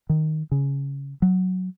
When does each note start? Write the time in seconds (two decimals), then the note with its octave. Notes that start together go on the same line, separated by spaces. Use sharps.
0.09 D#3
0.52 C#3
1.22 F#3